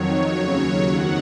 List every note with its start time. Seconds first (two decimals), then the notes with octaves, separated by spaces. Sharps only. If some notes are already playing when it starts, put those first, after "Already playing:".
Already playing: F2 D#3 F#3 C#5
0.34 D#2 C#3 F#3
0.88 F2 D#3 F#3 F#5